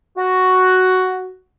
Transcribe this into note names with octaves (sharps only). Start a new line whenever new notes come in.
F#4